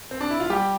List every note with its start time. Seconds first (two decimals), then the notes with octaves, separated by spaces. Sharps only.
0.11 C4
0.21 D4
0.30 E4
0.40 F4
0.50 G3 G4